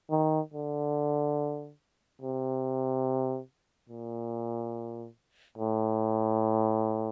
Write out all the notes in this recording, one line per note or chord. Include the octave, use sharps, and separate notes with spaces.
D#3
D3
C3
A#2
A2